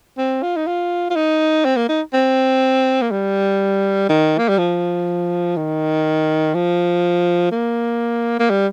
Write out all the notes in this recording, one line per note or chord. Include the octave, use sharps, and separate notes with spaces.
C4
F4
D#4
F4
F4
D#4
C4
A#3
D#4
C4
A#3
G3
D#3
A#3
G3
F3
D#3
F3
A#3
A#3
G3